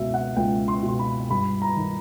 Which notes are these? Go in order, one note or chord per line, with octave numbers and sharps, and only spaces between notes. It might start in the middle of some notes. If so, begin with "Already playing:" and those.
Already playing: C#2 B2 E5
F#5
C#2 G5
C6
B2
C6
B5
G2 B5
A#5
D#3